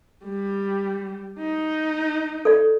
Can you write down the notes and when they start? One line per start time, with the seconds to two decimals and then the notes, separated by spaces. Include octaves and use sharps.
0.24 G3
1.39 D#4
2.45 A4 D5